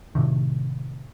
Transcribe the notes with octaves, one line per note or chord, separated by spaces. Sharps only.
A2 C3 D#3